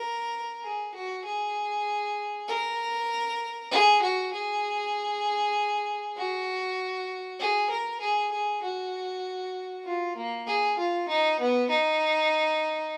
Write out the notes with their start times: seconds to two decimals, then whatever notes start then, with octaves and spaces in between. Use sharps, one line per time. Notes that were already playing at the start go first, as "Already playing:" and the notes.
Already playing: A#4
0.63 G#4
0.94 F#4
1.25 G#4
2.48 A#4
3.71 G#4
4.02 F#4
4.33 G#4
6.17 F#4
7.40 G#4
7.70 A#4
8.00 G#4
8.31 G#4
8.62 F#4
9.85 F4
10.16 A#3
10.47 G#4
10.78 F4
11.08 D#4
11.40 B3
11.70 D#4